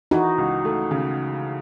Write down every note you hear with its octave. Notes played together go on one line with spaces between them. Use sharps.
E3 D#4 F#4
C#2
A3
C#3